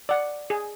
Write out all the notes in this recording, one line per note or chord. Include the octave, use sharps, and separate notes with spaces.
D5 F#5
G#4